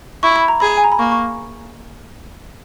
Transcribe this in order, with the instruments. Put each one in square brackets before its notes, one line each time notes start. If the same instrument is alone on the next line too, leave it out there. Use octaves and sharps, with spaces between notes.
[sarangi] E4 [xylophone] C#6
[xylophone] B5
A#5
[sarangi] G#4 [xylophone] B5
[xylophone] G#5
A#5
B5
[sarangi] A#3 [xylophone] C#6
[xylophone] C#6